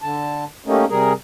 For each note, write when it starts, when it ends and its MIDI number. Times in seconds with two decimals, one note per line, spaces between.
0.02 0.44 50
0.02 0.44 81
0.66 0.85 55
0.66 0.85 57
0.66 0.85 58
0.66 0.85 61
0.66 0.85 63
0.90 1.13 48
0.90 1.13 55
0.90 1.13 68
0.90 1.13 70